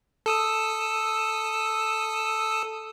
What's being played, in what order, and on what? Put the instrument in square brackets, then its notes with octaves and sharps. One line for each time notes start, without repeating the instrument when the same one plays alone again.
[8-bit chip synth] A4 D#6 E6